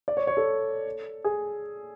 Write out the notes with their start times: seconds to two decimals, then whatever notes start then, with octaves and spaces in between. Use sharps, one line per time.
0.08 D5
0.17 C#5
0.27 C#5
0.37 A4
1.24 G#4